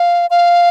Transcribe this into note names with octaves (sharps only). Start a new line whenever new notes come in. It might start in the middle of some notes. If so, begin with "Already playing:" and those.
Already playing: F5
F5